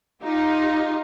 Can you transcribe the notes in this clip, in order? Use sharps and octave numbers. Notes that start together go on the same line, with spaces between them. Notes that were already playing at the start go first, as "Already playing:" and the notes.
D#4 F4 G4